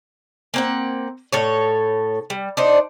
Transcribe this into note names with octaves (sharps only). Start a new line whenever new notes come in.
A#3 C4 F#5
A2 A4 C#5
G3
D4 D#4 C5